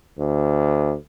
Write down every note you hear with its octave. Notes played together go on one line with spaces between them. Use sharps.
D2